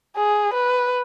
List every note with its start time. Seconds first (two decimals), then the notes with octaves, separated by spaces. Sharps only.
0.17 G#4
0.53 B4